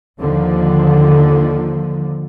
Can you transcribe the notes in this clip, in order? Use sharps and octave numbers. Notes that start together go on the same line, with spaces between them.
D#2 D3 D#3 F3